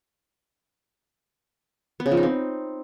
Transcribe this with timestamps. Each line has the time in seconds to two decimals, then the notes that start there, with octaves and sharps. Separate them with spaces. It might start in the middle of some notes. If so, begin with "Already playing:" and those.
2.00 B3
2.06 C#3
2.11 F3
2.17 D#4
2.23 C4